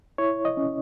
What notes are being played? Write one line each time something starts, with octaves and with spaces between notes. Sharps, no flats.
E4 C#5
D#5
C#4